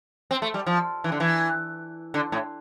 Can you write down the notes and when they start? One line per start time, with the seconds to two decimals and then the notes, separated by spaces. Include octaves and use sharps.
0.31 C4
0.42 A3
0.54 G3
0.66 F3
1.04 E3
1.12 D3
1.20 E3
2.14 D3
2.32 A2